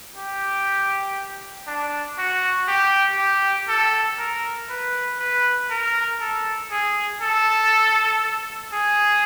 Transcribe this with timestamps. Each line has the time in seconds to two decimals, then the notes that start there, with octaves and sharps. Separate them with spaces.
0.16 G4
1.67 D4
2.18 F#4
2.68 G4
3.18 G4
3.69 A4
4.18 A#4
4.69 B4
5.20 B4
5.70 A#4
6.21 A4
6.71 G#4
7.21 A4
8.73 G#4